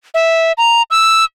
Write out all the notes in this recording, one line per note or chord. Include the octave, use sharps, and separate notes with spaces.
E5
A#5
E6